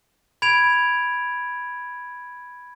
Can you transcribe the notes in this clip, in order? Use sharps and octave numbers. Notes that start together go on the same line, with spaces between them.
B5 G#6 D7 F7